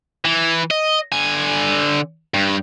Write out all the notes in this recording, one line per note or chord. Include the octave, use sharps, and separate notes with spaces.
E3
D#5
D3 G#5
G2